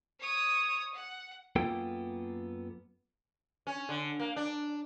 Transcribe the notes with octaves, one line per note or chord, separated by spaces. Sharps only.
C#5 D#6
F#5
F#2 A#3 B3 F4 A4 G5
C#4
D3
A#3
D4